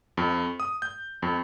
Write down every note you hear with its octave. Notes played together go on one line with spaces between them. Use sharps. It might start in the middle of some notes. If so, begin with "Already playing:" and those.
F2
D#6
G6
F2